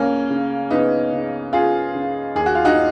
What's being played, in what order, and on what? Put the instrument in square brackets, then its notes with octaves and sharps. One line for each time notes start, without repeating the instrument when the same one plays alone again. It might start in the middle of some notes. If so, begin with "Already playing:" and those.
Already playing: [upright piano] C#2 C#3 A#3 C#4
C#3
C#2 B3 D#4
C#3
C#2 F4 G#4
C#3
D#2 G#4
F#4
F4
D#4 F#4